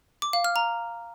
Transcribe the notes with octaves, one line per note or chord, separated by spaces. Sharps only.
D6
F5
F6
A#5